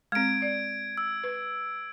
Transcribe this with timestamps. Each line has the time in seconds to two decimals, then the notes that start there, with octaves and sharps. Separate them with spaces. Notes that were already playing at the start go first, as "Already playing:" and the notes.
0.12 G#3 C4 G#6 D7
0.42 D5
0.98 E6
1.24 B4